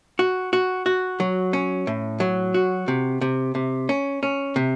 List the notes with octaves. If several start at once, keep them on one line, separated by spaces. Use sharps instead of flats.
F#4
F#4
F#4
F#3
C#4
A2
F#3
F#4
C3
C3
C3
C#4
C#4
C3